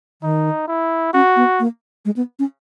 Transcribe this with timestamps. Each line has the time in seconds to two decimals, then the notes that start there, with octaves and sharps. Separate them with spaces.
0.22 D#3 D#4
0.68 E4
1.13 C#4 F#4
1.36 B3
1.60 A#3
2.05 G#3
2.17 B3
2.39 C#4